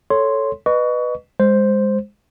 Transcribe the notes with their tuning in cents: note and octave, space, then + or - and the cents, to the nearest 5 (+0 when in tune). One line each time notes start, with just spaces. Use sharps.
A4 +0 C#5 +0 C6 +0
B4 +0 D#5 -25 C#6 +25
G#3 -20 C5 +0